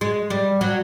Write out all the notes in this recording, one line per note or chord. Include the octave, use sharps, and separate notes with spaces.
G#3
G3
F#3